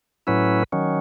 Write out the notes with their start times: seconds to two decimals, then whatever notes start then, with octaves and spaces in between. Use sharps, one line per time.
0.27 A2 F#3 C#4 E4 B4
0.72 D#3 F#3 C#4